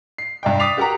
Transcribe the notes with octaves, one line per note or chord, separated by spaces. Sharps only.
C7
G2 D5 G5
D6 D#6 A6 B6 C7 F7
F#4 G4 A#4 F#5 A#5